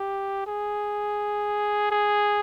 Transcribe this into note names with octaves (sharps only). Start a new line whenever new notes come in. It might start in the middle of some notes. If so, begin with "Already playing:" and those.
Already playing: G4
G#4
G#4